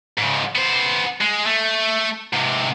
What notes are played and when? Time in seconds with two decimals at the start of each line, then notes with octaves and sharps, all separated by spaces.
0.18 G#2 C#3
0.56 B3 C5
1.21 G#3
1.46 A3
2.33 G#2 C3